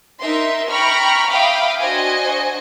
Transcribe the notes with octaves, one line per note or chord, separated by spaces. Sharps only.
D#4 A#4 E5 C6
G5 A#5 B5 C#6 F6
E5 F5 G5 B5 D6 D#6
D4 F#4 C5 D#5 G#5